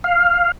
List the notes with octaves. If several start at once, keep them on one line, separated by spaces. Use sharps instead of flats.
F5